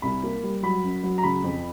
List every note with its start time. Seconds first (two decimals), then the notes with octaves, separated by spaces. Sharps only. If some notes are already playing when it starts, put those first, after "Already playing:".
0.02 C2 B5
0.23 A#3
0.43 G3
0.63 F#3 B5
0.84 F#2
1.03 F#3
1.18 A#5
1.23 C#3 B5
1.44 F2